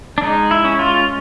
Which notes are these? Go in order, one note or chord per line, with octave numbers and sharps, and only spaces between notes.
D4
G#3 D#4
E4
C#4
F4